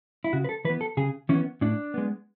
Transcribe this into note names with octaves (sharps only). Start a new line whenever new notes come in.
E4
C#3 F#4
B4
A4
E3 B3 B4
A4
C#3 G#4
E3 B3 C#4
A2 D4
G#3 B3